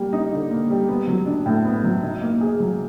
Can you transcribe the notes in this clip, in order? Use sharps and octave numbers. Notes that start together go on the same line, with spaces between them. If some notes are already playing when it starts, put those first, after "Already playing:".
Already playing: G3 A#3
D#4
D3
A#3
G3
B3
F#3
D4
A2
B3
F#3
D#4
A#3
G#4
F#3